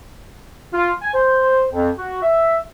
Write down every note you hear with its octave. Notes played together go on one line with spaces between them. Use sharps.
F4
G#5
C5
F2
F#4
E5